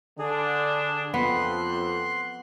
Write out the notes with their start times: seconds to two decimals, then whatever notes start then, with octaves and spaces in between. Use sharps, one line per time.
0.19 D3 D4 G#4
1.14 F2 B3 C6 F#6